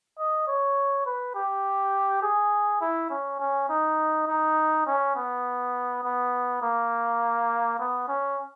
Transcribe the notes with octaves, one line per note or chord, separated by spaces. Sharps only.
D#5
C#5
B4
G4
G#4
E4
C#4
C#4
D#4
D#4
C#4
B3
B3
A#3
B3
C#4